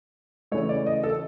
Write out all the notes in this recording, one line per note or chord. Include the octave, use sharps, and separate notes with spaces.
C#3 E3 A3 C#5
D5
D#5
A4